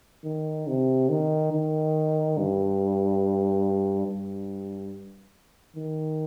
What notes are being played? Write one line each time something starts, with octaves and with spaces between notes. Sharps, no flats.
D#3
C3
D#3
D#3
G2
G2
D#3